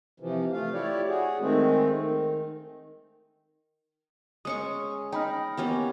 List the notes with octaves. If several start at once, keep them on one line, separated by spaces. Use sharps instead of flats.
C3 E3 F3
A3 F4 F5
E4 G4 C#5 D5
F#4 G#4
D#3 G#3 A3 C4
D#3
G#3 C#4 C#6 D#6
D#4 G5 B5 F6
E3 A#3 B3 C#4 G4